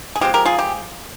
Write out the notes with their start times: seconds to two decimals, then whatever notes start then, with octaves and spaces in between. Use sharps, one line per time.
0.16 G#4
0.21 F3 G#3 C4 G4
0.34 G4 A#4
0.45 F4 G#4
0.59 G4